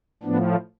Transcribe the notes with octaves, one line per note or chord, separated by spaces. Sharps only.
A2 F3 B3 D4